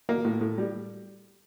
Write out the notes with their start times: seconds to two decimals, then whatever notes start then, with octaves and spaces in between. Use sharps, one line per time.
0.09 A#3
0.25 A2
0.41 A2
0.58 G3